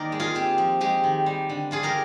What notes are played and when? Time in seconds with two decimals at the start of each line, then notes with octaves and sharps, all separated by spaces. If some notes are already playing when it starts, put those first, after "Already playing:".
Already playing: D#3 A#3 D#4 A#4 C5 D5
0.12 G#3
0.20 F4 G#4
0.35 C4 G4
0.58 F3
0.81 G#3 G4
1.04 D#3
1.26 G3
1.50 D3
1.71 D4 F4 G#4
1.83 G4 A#4